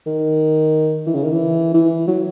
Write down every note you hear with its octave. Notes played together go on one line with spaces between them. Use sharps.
D#3
E3
C#3
D#3
E3
E3
F#3